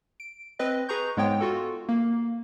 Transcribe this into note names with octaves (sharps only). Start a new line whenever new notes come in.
D7
C4 B4 D#5
G#4 B4 A#5 C#6 G6
G#2 G#3 B3 C#5 G5
F4 F#4 A4
A#3